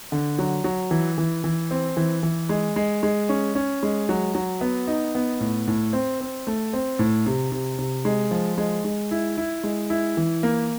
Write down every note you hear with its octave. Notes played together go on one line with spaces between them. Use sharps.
D3
F#3
F#3
E3
E3
E3
C4
E3
E3
G#3
G#3
G#3
C#4
C#4
G#3
F#3
F#3
B3
D#4
B3
A2
A2
C4
C4
A3
C4
A2
C3
C3
C3
G#3
F3
G#3
G#3
E4
E4
G#3
E4
E3
A#3